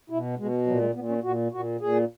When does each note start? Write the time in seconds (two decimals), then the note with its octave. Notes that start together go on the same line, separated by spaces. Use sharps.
0.10 B2 E4
0.38 B2 G#3
0.67 A#2 F#3
0.81 G#3
0.95 A#2 B3
1.09 C#4
1.24 A#2 F#4
1.52 A#2 F#4
1.81 A#2 G#4